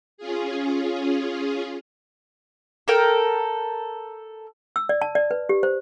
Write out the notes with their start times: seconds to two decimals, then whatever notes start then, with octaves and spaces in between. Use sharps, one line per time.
0.18 C#4 F4 G#4
2.88 A4 A#4 G5
4.76 E6
4.89 D5
5.02 A5
5.15 D5
5.31 B4
5.49 G4
5.63 C5